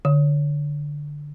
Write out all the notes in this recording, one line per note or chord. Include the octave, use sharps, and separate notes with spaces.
D3